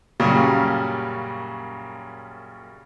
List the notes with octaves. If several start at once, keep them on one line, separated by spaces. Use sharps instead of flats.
F#2 A#2 C#3 F#3 G3